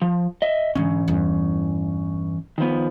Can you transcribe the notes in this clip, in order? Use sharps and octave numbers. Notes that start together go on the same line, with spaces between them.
F3
D#5 E5
G#2 D3 E3 C#4
E2 G2
D#3 F3 B3